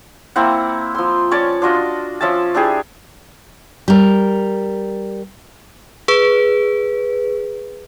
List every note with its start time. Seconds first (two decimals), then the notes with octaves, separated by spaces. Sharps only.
0.36 A#3 C4 E4 F#5
0.95 F3 C6
1.31 C#4 C#5 D5 A5
1.62 D4 F4 F#4 D#5
2.21 F3 C#4 E5 A5
2.55 D4 E4 G4 G#4
3.88 G3 A#4
6.08 G#4 B4